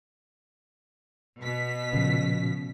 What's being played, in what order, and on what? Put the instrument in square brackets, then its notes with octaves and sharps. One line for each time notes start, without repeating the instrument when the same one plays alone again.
[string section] B2 B6
[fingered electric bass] A#2 F3 [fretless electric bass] C#3